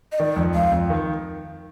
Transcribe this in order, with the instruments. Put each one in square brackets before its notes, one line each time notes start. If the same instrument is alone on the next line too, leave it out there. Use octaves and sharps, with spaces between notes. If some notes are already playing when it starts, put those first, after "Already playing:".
[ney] D#5
[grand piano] D#3 [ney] D5
[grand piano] F2
[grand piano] F2 [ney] F5
[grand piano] F2
D#3